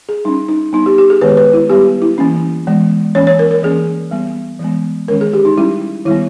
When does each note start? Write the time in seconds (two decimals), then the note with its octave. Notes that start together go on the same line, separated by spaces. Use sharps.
0.09 G#4
0.25 G3 C#4 D#4
0.49 D#4
0.73 G3 B3 D#4
0.86 G4
0.98 G4
1.10 G#4
1.21 D#3 G#3 B3 B4
1.37 B4
1.53 E4
1.70 G3 B3 G4
2.02 E4
2.18 E3 A#3 C#4
2.67 E3 G#3 B3
3.15 E3 A#3 C#4 C#5
3.27 C#5
3.39 A#4
3.51 A#4
3.63 E3 A#3 C#4 G#4
4.11 G3 B3
4.60 E3 G#3 B3
5.08 D#3 G#3 C#4 A#4
5.21 G#4
5.33 G4
5.45 D#4
5.57 G3 C#4 E4
6.05 D#3 G3 B3 E4